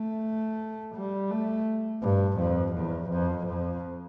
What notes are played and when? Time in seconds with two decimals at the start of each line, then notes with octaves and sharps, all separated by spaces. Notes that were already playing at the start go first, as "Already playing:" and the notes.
Already playing: A3
0.95 G3
1.31 A3
2.02 G2
2.39 F2
2.74 E2
3.10 F2
3.47 F2